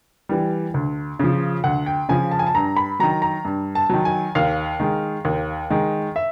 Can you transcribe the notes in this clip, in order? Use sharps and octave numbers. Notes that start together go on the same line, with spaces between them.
E3 G3
D2
C#3 F3
D2 F#5
G5
C#3 F3 G#5
A5
G#5
A5
G2 A#5
B5
D#3 F#3 A#5
A#5
G2
A5
D#3 F#3
G#5
D#2 F5
D#3 G#3
D#2
D#3 G#3
E5